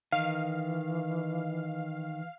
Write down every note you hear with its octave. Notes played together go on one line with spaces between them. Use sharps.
D#3 E3 F5